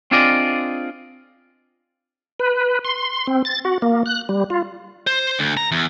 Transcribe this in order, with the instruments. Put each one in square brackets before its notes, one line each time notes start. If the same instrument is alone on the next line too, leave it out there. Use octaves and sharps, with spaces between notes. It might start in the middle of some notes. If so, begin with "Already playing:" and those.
[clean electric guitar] C4 D4 F4 G#4 D5 D#5
[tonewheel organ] B4
C6
C4
A6
F#4
A#3
F#6
G3
F4
[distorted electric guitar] C5
D2
A#5
E2